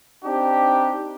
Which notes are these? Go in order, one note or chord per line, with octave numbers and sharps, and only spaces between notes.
C4 D4 D#4 G4